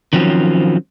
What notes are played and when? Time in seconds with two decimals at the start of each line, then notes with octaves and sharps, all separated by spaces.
0.13 D#3 F3 F#3 C4 C#4